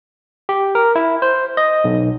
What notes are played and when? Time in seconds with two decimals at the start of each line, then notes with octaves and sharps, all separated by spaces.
0.49 G4
0.75 A#4
0.95 E4
1.22 C5
1.57 D#5
1.84 B1